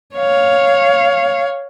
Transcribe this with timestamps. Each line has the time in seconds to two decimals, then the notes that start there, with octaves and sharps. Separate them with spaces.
0.15 C#5 F5